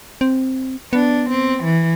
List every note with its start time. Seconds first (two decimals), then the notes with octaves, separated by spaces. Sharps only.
0.21 C4
0.93 B3 D4
1.31 C4
1.64 E3